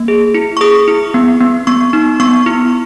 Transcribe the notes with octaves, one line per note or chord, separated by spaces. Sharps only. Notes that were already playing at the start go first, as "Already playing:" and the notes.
Already playing: A#3
G#4
E4
C#6
G#4 D#6
E4
B3
B3
B3 C#6
D#4
B3 C#6
E4